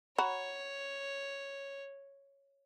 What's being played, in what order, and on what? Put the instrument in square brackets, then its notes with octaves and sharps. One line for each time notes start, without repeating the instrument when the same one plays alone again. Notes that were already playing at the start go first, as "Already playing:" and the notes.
[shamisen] F#4 [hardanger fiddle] C#5 [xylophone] A#5 B5